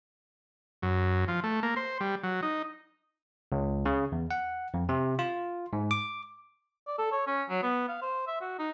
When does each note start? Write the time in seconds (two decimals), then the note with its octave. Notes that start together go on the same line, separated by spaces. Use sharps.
0.82 F#2
1.28 F3
1.44 A3
1.63 A#3
1.76 C5
2.01 G3
2.23 F#3
2.42 D#4
3.52 C#2
3.85 C#3
4.12 E2
4.31 F#5
4.74 F2
4.89 C3
5.19 F4
5.73 G#2
5.91 D6
6.87 D5
6.98 A4
7.12 C#5
7.27 C#4
7.50 F#3
7.62 B3
7.89 F5
8.01 C5
8.27 E5
8.41 F#4
8.59 D#4